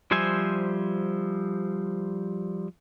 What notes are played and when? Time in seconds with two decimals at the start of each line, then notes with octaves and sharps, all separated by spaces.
0.11 F3 G3 C5 E5 G#5